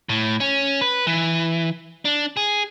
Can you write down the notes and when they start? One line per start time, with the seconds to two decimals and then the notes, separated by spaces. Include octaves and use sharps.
0.09 A2
0.40 C#4
0.81 B4
1.07 E3
2.05 D4
2.37 G#4